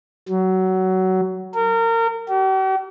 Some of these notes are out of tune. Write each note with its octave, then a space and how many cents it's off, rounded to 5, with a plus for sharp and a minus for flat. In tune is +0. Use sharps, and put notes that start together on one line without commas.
F#3 +20
A#4 -30
G4 -45